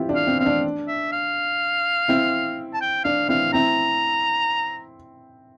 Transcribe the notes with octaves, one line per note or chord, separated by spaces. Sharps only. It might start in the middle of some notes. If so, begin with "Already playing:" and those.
Already playing: C4 E4 F4 G4
D4
F5
C4
C4 F5
D4
E5
F5
C4 E4
A5
G5
D4 F5
C4 E4 F5
C4 E4 A#5